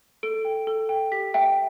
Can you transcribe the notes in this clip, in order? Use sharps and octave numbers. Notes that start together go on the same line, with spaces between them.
A4 D7
G5
A4
G5
G4 B6
E5 G5